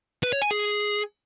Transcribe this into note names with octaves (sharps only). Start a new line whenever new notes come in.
B4
C#5
G#5
G#4